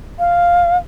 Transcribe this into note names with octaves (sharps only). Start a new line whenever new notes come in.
F5